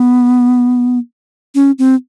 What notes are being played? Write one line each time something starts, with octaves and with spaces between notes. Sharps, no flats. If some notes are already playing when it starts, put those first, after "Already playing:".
Already playing: B3
C#4
C4